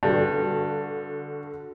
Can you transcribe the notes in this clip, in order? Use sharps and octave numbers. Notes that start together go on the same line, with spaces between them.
G2 D3 F#4